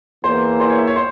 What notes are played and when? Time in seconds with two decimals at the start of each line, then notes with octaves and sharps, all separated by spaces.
0.24 E2 E3 A#3 C5
0.60 C5
0.70 C#5
0.78 E5
0.87 C#5
0.96 C5